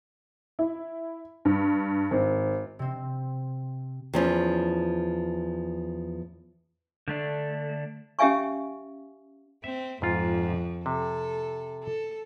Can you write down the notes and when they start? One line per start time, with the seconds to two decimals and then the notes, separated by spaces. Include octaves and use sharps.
0.59 E4
1.45 G2
2.11 G#1
2.79 C3 C4
4.13 E2 F3 C#4
7.08 D3 A3 D4
8.19 C#4 G4 E5 F5 G#5 C#6
9.64 C4 E5
10.02 F2 G#2 F4
10.86 C3 A4
11.84 A4